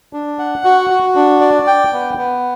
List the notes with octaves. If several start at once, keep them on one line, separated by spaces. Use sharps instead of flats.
D4
F#5
F#4
F#4
D4
D5
G5
B3
B3